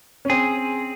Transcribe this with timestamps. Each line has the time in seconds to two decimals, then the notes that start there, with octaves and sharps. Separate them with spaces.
0.25 C#4
0.29 C4 G#4